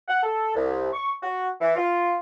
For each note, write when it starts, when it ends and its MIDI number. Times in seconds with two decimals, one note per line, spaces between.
0.08 0.20 78
0.23 0.52 69
0.55 0.88 36
0.93 1.12 85
1.23 1.48 66
1.61 1.76 52
1.76 2.17 65